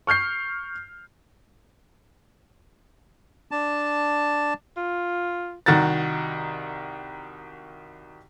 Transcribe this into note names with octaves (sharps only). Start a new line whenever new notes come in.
C#6 F6 G6 C7
D4 A5
F4
C2 D#3 F#4 A#5 A6